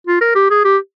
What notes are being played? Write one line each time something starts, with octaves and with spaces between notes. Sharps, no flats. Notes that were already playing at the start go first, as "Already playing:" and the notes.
F4
A#4
G4
G#4
G4